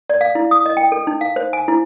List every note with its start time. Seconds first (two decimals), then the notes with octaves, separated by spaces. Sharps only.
0.10 D5
0.21 F5
0.35 E4
0.51 D#6
0.66 D#5
0.77 G5
0.92 A4
1.07 D#4
1.21 F5
1.36 C5
1.53 G#5
1.68 E4